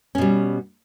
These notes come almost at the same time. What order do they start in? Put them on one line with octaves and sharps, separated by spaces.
C#4 B2 G3